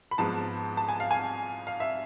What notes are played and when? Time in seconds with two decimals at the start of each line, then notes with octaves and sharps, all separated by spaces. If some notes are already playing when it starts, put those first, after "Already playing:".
0.11 B5
0.18 G#2 F3 B3 A5
0.77 A5
0.89 G#5
1.00 F5
1.11 G#5
1.67 F5
1.80 E5